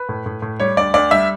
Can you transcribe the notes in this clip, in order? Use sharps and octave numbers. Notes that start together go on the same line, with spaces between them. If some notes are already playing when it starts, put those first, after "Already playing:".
Already playing: B4
A2
A2
A2
G3 C#5
D2 D5
D2 D5
G3 E5